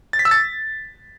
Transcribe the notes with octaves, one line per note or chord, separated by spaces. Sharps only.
A6
B6
E6
A6